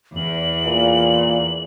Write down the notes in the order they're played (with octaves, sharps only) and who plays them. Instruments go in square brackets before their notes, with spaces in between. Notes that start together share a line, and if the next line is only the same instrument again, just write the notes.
[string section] E2 [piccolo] F#7
[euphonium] A#2